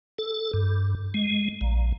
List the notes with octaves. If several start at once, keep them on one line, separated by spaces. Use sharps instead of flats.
A4
G2
G#3
A#1